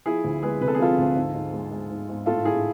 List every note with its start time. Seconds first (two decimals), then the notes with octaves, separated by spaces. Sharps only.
0.05 F3 E4 G#4
0.24 D2
0.42 G#3 G#4 B4
0.61 C3 B4
0.68 A4
0.75 G#4
0.79 F3 F4 A4
0.98 D2
1.16 G#2
1.34 G#2
1.53 G#3
1.71 G#3
1.90 G#2
2.09 G#2
2.26 A2 F4 A4
2.45 A2 E4 G#4